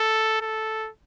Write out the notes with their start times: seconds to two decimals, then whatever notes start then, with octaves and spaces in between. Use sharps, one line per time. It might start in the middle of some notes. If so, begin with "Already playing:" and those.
Already playing: A4
0.41 A4